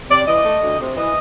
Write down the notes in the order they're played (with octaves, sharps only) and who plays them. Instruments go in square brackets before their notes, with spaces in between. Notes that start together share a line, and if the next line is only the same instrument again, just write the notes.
[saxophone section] C3 D5
E3 D#5
A3
D2
C3
E3 D#5